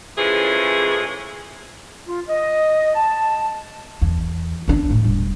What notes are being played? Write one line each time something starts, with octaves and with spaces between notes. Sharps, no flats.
A2 C#3 E3 F3 G#3 G#4
F4
D#5
A5
E2
E2 D4
A2
E1 G3